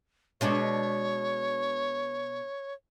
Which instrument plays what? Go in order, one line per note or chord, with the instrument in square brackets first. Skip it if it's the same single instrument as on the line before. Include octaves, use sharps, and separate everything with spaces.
[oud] B2 G#3 D4 [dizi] C#5